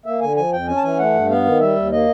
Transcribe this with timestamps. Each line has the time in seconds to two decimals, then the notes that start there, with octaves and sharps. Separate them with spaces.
0.06 A#3 E5
0.21 D3 G#5
0.37 F3 G#5
0.53 F2 G5
0.67 C#4 G#5
0.77 A5
0.83 E3 G#5
0.99 A3 F#5
1.14 G2
1.30 B3 F5
1.45 D#3
1.60 G3 E5
1.76 D#2
1.92 A#3 D#5